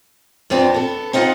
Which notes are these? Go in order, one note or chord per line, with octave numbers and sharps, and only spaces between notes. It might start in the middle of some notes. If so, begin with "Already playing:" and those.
F2 B3 C4 D4
B3 A4
C4 D#4 F4 C5 D#5 F#5